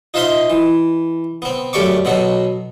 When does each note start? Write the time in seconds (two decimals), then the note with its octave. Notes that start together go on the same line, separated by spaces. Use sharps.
0.14 D#4 F4 C5 E5 F5 C6
0.50 E3
1.42 B3 C4
1.73 F#2 A3 G4 D5 C#6 D6
2.05 B2 F#3 B3 A4